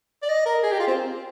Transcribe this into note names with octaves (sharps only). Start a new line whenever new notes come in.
D5
D#5
A#4
G#4
G4
F4
C4